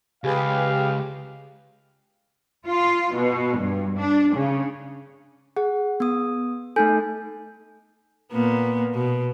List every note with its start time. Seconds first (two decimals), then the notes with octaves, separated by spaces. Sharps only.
0.24 C#2 G4 G#4 B4 F5
2.66 F4
3.15 B2
3.59 G2
3.97 D4
4.35 C#3
5.57 G#4 F#5
6.00 B3 D#6
6.76 A3 D#4 A4 G#5 G6
8.33 A#2 A#3 B3
8.94 B2